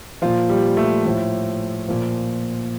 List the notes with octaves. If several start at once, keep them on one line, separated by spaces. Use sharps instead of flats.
A#2 F3 F4
G3
A3
A2 F3
A#2 F3